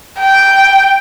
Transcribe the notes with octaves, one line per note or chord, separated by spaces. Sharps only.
G5